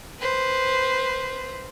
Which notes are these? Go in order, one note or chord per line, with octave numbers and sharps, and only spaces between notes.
B4 C5